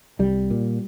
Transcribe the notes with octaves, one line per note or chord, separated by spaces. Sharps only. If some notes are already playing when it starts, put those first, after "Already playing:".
C2 G3
A#2